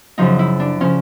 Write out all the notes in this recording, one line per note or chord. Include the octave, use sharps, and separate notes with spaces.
F#2 C#3 F3 D#4
E4
D4
C#3 F3 C#4